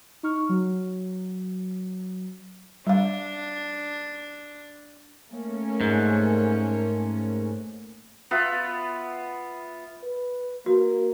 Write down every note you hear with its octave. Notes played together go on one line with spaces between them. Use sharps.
D#4 C#6 F6
F#3
G3 D4 F5
A3 A#3 C#4
G#2
B3 F4 E5
B4
A#3 F#4